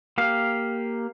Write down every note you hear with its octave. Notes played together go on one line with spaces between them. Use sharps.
A#3 G4 F5